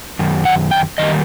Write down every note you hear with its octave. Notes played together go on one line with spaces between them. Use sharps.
F#2 D#3
F#5
G5
F#2 D#3 G3 A#3 D#5